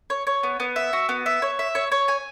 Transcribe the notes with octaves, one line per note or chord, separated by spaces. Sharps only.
C#5
C#5
B3
B3
E5
F#4
B3
E5
C#5
E5
C#5
C#5
G#5